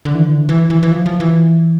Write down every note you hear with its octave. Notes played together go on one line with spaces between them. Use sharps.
D3
E3
D3
E3
E3
E3
F3
F3
E3